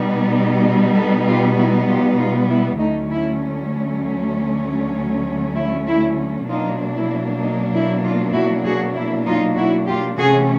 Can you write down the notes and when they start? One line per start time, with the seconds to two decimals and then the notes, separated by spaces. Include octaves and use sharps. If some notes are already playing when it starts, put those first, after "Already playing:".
Already playing: B2 G3 B3 D#4
0.96 A4 B4
1.27 F4 G4
1.57 E4 F#4
1.88 F4 G4
2.18 D#4 F4
2.50 E4
2.81 D2 D3 F#3 A3 C#4 D#4
3.11 E4
5.57 E4
5.88 E4
6.49 B2 F#3 A#3 D4 D#4 F4
6.96 E4
7.41 D#4
7.73 E4
8.03 D#4 F4
8.34 E4 F#4
8.64 F#4 G#4
8.95 E4
9.26 D#4 F4
9.56 E4 F#4
9.87 F4 G4
10.18 C3 E3 A3 C#4 F#4 G#4